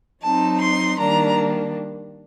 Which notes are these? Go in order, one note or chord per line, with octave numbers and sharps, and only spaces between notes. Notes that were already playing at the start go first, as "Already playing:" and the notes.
F#3 C4 D#4 A5
C6
D#3 G3 A#3 D4 A#5